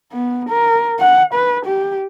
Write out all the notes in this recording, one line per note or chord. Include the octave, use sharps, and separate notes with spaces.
B3
A#4
F#5
B4
G4